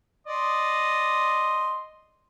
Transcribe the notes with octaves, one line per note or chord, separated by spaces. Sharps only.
D5 D#5 C6